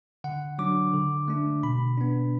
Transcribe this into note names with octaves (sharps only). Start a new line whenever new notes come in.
D3 F#5
F#3 D4 D6
D3
A3 D4
B2 B5
B3 D4